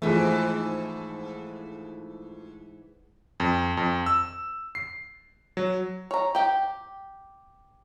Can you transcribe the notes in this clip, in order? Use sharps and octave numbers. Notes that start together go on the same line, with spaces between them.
G#2 E3 F3 G#3 A3 E4 G#4
F2
F2
E6
C7
F#3
C#5 A#5
G4 G5